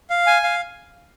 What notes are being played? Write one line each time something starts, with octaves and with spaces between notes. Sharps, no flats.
F5
G#5
F5